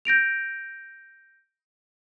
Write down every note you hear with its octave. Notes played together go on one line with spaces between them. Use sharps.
G6 A#6 D7 F7